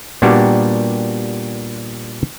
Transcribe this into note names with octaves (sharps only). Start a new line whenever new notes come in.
A#2 G3 B3 D4 F#4 G4